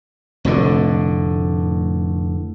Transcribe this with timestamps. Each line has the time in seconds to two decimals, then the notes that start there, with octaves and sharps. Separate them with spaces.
0.45 F1 A2 D3